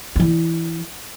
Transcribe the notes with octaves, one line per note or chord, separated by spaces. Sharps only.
E3 D4